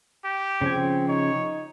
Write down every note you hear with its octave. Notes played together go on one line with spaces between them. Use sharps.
G4
C#3 F3 C4 G#5
D#4 C#5